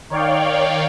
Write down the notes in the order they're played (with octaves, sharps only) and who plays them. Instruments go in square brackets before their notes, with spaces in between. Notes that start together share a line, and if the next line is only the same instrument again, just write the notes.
[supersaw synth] D#3 C#5 D5 F5 G5